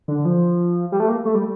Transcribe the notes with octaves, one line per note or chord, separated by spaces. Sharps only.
D3
F3
G3
A3
A#3
A3
G3